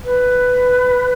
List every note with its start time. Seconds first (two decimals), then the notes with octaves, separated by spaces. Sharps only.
0.05 B4